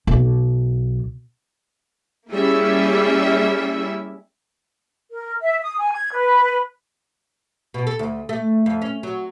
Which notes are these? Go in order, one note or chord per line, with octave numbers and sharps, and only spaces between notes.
B1
G3 A#3 C#4 E4 G#4 E5
A#4
E5
D#6
G#5
G#6
B4
B2
A4
D2
A3
F2
C#4
F#3